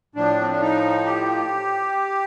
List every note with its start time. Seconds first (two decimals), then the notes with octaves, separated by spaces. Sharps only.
0.15 A2 F3 D4
0.41 C4
0.51 D4
0.61 D#4
1.06 G4